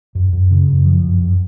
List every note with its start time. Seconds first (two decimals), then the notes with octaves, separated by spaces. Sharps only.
0.15 F#2
0.33 F#2
0.51 C#3
0.68 F#2
0.86 F3
1.04 F#2
1.22 F#2